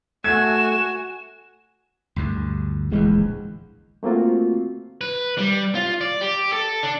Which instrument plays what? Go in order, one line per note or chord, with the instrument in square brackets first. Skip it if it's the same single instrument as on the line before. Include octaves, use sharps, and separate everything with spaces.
[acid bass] A3 [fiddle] F#4 G#5 [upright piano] G#6 [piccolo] E7
[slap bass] D2 G2 D3
[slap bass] D1 A#1 E2 [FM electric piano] E3 G#3
[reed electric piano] A3 A#3 C4 F4 F#4
[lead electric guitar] B4
G3
F4
D5
G4
A4
D4